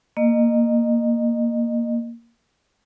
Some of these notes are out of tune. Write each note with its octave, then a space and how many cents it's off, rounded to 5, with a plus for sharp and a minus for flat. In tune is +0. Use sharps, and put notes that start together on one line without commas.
A#3 +0 D#5 -25